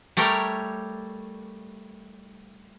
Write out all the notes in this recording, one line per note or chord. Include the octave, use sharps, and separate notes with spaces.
G3 A3 A#4 C#5 G5